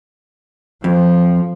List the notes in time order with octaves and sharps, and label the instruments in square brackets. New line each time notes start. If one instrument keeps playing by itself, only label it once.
[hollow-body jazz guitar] F2 [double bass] F3